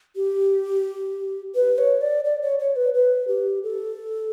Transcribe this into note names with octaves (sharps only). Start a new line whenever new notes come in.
G4
B4
C#5
D5
D5
C#5
C#5
B4
B4
G4
A4